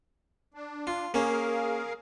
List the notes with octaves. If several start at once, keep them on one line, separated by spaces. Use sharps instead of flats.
D4
F4
A#3 C#4 G#4 A#4 F5